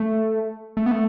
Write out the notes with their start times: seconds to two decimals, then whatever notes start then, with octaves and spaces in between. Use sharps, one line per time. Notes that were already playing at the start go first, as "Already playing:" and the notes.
Already playing: A3
0.77 A3
0.86 B3
0.91 A3